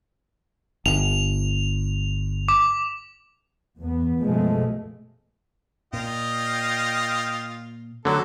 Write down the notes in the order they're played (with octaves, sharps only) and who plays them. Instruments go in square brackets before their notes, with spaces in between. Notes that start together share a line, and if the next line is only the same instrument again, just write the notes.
[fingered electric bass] G1 [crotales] F7
[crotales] D6
[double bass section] E2 B3
F#2 B2 F3 G#3 A3
[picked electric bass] A#2 [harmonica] F4 D#5 G5
[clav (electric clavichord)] D3 F#3 [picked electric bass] A3 [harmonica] A4